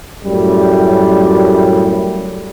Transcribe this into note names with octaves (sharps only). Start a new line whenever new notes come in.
F#2 A2 G3